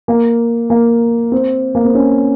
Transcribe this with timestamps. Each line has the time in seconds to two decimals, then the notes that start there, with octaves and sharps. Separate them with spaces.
0.08 A#3
0.70 A#3
1.32 C4
1.75 A#3
1.85 C4
1.95 C#4